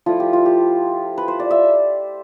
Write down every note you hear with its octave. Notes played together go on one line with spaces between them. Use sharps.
F3 A3 E4 F4
G4
F4
G4
B4
C5
D5
E5